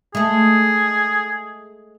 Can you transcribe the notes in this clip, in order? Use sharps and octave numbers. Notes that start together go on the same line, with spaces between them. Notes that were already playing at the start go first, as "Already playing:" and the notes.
G#3 A3 G#4